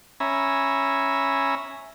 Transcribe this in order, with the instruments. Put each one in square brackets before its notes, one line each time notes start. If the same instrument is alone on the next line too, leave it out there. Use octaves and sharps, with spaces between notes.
[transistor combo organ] C#4 E5 G#5 A#5 B5